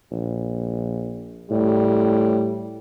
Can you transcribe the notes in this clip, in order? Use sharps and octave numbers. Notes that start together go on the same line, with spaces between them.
A#1
A2 G3